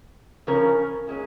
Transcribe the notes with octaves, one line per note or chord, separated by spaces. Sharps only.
C#3 F3 C#4 A#4
A#2 G#3 C#4